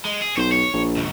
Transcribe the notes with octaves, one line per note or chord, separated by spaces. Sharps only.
G#3
G#4
B1 C5 C#5
C#5
A#1
C#2 F#2